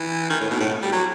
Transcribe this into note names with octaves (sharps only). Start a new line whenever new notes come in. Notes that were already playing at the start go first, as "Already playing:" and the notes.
Already playing: E3
D#3
A2
B2
A2
G3
F#3